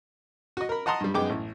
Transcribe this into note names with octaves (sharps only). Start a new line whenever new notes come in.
F#4 D#5
A#4 B5
D#5 F#5 A5 A#5 C6 D#6
G2 G3
F#2 G#3 B3 D#4 G5 D6
A1